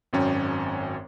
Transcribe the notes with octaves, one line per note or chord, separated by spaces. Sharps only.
G#1 F#2 C#4 G5